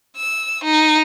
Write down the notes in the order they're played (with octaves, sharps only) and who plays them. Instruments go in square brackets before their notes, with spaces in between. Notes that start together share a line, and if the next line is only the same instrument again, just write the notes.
[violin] E6
D#4